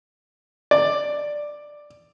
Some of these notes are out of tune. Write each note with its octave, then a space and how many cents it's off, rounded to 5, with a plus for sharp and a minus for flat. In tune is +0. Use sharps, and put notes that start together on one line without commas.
D5 +5